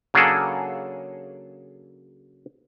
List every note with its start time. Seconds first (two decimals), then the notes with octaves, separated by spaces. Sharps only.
0.14 C#3 F#3 A#3 D4 G#4 A4